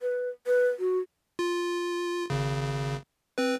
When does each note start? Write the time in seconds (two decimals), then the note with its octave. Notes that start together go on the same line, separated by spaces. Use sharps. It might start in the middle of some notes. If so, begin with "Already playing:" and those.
0.01 B4
0.47 B4
0.79 F#4
1.39 F4
2.30 G#1 C#3
3.38 C4 B4